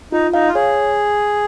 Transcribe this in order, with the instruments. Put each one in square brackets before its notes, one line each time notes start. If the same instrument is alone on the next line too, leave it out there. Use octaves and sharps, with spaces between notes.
[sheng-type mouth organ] D#4 [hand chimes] F4
[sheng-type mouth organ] D#4 [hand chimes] F5
[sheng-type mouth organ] F4
[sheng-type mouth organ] G#4 [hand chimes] C#5